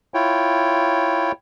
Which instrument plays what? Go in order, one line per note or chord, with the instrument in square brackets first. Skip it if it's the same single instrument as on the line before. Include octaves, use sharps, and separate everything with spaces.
[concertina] E4 F4 C#5 G5